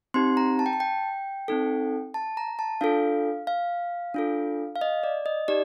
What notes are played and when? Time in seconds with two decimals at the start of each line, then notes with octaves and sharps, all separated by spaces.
0.14 C4 D#4 G4 C6
0.37 A#5
0.59 A5
0.66 G5
0.73 A5
0.80 G5
1.48 C4 D#4 A4
2.14 A5
2.37 A#5
2.59 A5
2.81 D4 F4 A4 F5
3.47 F5
4.14 D4 F4 A4
4.76 F5
4.81 D#5
5.03 D5
5.26 D#5
5.48 D#4 G4 D5